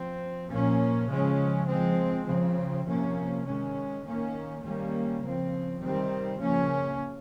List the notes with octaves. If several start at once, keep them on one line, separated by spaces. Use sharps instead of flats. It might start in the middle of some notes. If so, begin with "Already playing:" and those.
Already playing: F3 C4
A#2 F3 A#3 C#4
C#3 F3 G#3 C#4
F3 G#3 C4
C#3 F3 C4
C3 F3 A#3 C#4
D#3 G#3 C#4
D#3 A#3 C#4
D#3 G3 A#3 C#4
C#3 F3 C4
C3 D#3 G3 C4
C#3 F3 A#3 C#4